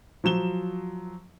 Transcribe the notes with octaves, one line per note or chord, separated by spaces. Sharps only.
F3 F#3 E7 G7